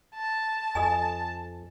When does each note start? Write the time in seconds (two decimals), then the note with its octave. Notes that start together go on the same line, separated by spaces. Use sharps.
0.15 A5
0.75 F2 A4 D#5 G#5